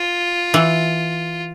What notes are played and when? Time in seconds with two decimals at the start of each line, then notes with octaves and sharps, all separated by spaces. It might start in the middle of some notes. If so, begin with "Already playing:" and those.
Already playing: F4
0.54 E3